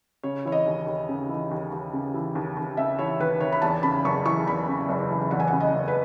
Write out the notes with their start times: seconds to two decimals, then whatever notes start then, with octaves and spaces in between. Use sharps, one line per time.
0.24 C#3 C#5
0.45 E3 C#5
0.52 D#5
0.66 D#2
0.86 D#2
1.09 C#3
1.29 E3
1.51 D#2
1.72 D#2
1.93 C#3
2.14 E3
2.35 D#2
2.57 D#2
2.77 C#3 E5
2.99 E3 C#5
3.20 D#2 B4
3.40 D#2 C#5
3.52 B5
3.62 E2 A5
3.83 C#3 B5
4.04 F#1 C#6
4.26 E3 C#6
4.46 E2 B5
4.68 C#3
4.89 F#1
5.11 E3
5.31 E2 F#5
5.40 G#5
5.48 F#5
5.53 C#3
5.60 D#5
5.74 F#1
5.88 B4